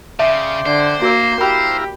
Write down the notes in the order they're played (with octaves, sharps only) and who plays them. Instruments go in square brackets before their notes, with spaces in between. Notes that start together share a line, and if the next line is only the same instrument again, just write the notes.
[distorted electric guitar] C#3 [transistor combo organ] D5 G5 C6 [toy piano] E5
[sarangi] D3 [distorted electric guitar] C5
[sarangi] A#3 [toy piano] F#4 A#4
[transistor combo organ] E4 F5 A#5 [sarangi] G4 [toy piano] B5